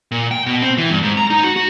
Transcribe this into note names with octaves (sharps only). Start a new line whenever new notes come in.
A#2
G5
B2
C4
E3
G2
G#2
A#5
D#4
F#4
F#4